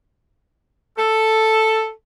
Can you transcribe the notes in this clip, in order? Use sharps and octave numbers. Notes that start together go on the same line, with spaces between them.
A4